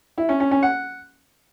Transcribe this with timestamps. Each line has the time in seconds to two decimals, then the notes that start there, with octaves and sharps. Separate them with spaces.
0.18 E4
0.29 C#4
0.40 C#4
0.51 C#4
0.63 F#5